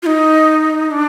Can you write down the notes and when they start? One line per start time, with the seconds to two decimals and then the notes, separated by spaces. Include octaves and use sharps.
0.03 F4
0.06 D#4
0.91 D4